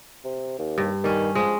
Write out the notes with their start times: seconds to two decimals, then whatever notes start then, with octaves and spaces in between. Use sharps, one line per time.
0.25 C3
0.59 D#2
0.78 G2
1.04 D#3 G3 C#4
1.35 F3 G#3